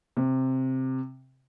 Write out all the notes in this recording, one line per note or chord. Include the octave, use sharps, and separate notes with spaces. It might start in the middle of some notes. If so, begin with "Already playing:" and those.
C3